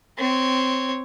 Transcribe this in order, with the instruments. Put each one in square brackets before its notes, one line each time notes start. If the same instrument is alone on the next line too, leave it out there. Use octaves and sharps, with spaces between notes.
[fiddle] C4 C#5